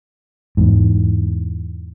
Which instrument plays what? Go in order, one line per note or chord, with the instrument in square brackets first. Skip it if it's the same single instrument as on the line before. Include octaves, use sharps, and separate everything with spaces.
[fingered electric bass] E2 G#2